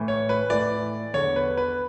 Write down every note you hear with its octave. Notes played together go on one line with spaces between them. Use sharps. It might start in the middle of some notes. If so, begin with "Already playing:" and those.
Already playing: A2 E3
C#5
B4
A2 E3 D5
E2 D3 C#5
B4
B4